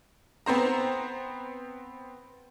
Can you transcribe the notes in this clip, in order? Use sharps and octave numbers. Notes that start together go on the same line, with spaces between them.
B3 C4 C5 A#5